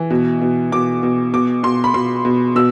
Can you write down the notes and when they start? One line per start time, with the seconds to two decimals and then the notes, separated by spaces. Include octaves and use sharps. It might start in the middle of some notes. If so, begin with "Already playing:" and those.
Already playing: E3
0.10 B2
0.41 B2
0.72 B2 D6
1.03 B2
1.33 B2 D6
1.63 B2 C6
1.84 B5
1.94 B2 C6
2.25 B2
2.56 B2 E6